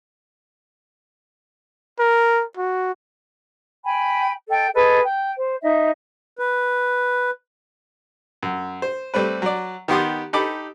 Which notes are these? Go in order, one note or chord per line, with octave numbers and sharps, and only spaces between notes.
A#4
F#4
G5 G#5 B5
A4 D#5 G5
G#4 A4 B4 D#5
G5
C5
D#4 D#5 E5
B4
F#2
C5
G3 A3 C4 B4
F#3 D5
D#3 B3 G4 C6 D#6
D#4 G4 A4 B5 D6